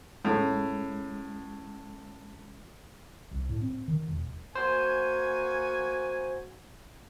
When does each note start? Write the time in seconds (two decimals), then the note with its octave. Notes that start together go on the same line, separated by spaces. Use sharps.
0.25 A2 G#3 C#4
3.31 C2
3.49 A2
3.61 C4
3.88 D#3
4.08 E1
4.55 A#3 F#4 C5 G#5